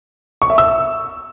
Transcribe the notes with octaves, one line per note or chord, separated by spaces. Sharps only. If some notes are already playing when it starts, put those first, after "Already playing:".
C#6
E5
E6